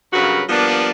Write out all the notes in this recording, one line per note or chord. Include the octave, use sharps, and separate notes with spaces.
G2 C#3 F#3 F#4 A#4 B4
F3 G3 A#3 B3 D4